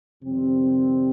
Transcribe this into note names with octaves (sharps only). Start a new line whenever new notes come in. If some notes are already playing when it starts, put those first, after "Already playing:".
F2 C3 D#3 G3 C4